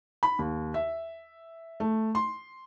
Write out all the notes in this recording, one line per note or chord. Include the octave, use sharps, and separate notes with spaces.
B5
D#2
E5
A3
C6